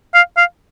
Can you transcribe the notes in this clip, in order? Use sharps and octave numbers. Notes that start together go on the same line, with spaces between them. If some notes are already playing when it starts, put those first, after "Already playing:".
F5
F5